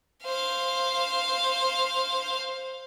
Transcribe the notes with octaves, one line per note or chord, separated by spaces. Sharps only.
C5 F5